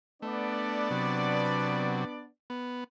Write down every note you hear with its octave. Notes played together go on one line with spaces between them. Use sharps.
A3 B3 D4 D5
C3 F#3
B3